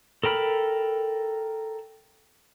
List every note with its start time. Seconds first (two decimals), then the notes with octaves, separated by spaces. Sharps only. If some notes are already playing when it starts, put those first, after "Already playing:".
0.24 A4 A#4 G5 B5 F6